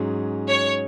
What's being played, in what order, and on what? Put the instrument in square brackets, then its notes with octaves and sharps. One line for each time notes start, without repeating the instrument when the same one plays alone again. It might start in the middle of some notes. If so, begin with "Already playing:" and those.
Already playing: [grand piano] G#2 F#3 C#4 G#4
[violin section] C#5